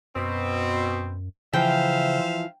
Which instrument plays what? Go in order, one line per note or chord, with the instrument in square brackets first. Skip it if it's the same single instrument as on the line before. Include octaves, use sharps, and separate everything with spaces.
[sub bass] F#2 [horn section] B2 C4
[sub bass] C#3 [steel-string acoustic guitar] E3 F3 [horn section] C5 E5 F5 [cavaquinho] G5